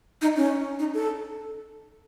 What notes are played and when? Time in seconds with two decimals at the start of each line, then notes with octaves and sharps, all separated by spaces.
0.22 D#4
0.36 C#4
0.79 D#4
0.94 A4